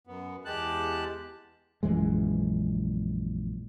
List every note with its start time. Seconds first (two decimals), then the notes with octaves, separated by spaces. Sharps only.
0.07 F#2 B3
0.45 E2 G#3 G4 A5 F#6
1.83 A#1 F#2 E3 G#3